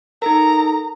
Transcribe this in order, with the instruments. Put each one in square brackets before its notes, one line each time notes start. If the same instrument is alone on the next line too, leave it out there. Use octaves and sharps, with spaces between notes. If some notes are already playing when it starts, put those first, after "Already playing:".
[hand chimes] D#4 A4 A#4 [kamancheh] A#5